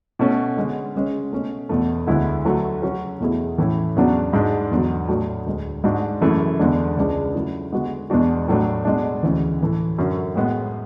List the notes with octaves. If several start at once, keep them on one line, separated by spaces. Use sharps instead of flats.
B2 A3 C#4
D3 G#3 B3
C#3 G#3 C#4
B2 A3 C#4
E2 B2 A3
D2 D3 G#3 B3 E4
D3 F#3 A3
C#3 F#3 C#4 F#4
E2 B2 A3 E4 G#4
A2 E3 A3 C#4 E4
E2 C#3 F#3 B3 D4
G#2 G#3 D4
E2 D3 F#3
A2 F#3 A3 D4 F#4
D2 D3 G#3
G#2 G#3 D4 F#4
F#2 C#3 E3 A3 E4
E2 D3 G#3 D4
C#2 C#3 G#3 D4 G#4
C#3 F#3 A3 E4
D3 G#3 B3 F#4
E2 B2 G#3 D4 F#4
A2 F#3 A3 D4
B2 G#3 D4
D2 C#3 E3
A2 E3 A3
F#2 D3 F#3 C#4
A2 G#3 B3